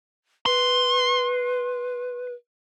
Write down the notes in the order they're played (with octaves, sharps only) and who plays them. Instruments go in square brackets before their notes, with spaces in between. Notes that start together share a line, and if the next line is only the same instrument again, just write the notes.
[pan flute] B4 [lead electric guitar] C6